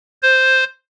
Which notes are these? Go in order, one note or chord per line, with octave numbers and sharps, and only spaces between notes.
C5